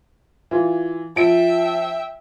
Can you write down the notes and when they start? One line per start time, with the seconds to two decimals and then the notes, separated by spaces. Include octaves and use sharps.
0.51 E3 F4
1.16 F3 E5 G5 D7